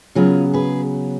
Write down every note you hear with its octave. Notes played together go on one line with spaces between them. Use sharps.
C#3 F#3 B3 F4 G#4
G#4 B4